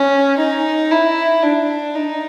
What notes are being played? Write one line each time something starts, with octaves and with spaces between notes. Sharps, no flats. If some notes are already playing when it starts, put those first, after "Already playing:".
Already playing: C#4
D#4
E4
D4
D#4